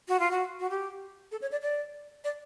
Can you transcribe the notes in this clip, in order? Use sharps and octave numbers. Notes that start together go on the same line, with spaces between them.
F#4
F4
F#4
F#4
G4
A4
C#5
D5
D5
D5